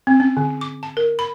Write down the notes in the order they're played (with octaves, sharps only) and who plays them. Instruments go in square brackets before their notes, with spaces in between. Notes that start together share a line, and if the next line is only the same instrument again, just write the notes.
[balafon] C4
C#4
D3
D6
A5
A#4
B5